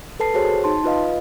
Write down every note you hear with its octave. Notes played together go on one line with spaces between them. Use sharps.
A4 B4 A5 C7
F#4 G#4 C5 C#5
D#4 A5 C6
F4 B4 D#5 F5